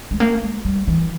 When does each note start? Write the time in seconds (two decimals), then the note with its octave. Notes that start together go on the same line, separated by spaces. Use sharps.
0.11 G#3
0.20 A#3
0.42 G#3
0.65 G3
0.88 E3